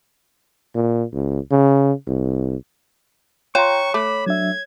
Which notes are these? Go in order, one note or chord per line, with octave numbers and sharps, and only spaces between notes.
A#2
C#2
C#3
C2
F4 C#5 G5 A#5 C#6
A3 B5 D6
F#3 D4 E5 G#6